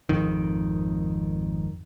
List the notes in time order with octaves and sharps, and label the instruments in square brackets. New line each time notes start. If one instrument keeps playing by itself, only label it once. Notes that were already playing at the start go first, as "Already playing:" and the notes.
[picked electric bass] G#1 F2 D#3